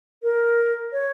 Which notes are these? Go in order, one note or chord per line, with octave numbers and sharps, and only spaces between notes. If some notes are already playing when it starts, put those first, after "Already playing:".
A#4
C#5